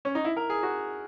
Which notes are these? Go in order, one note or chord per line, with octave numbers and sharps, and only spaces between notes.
C#4
D#4
E4
A#4
G#4
F#4